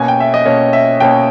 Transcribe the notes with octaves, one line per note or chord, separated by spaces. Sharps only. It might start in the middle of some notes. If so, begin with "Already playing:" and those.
Already playing: B2 A#3 C#4 G#5
G5
E5
D#5
B2 A#3 C#4 C#5
E5
B2 A#3 C#4 G5